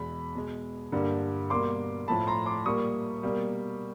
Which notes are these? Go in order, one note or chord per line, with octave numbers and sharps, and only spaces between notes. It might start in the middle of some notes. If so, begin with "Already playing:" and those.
Already playing: E2 B2 G#3 B5
B2 G#3
G2 D3 G3 A#3
B2 G3 A#3 C6 D6
A2 F3 A3 A5 B5
A#5 C6
C6 D6
A#2 G3 A#3 C#6 D#6
B2 G3 A#3